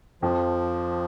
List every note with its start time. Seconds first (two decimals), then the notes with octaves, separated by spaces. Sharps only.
0.22 F2 F3